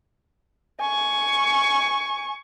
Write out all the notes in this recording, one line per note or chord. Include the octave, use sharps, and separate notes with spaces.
G#5 C#6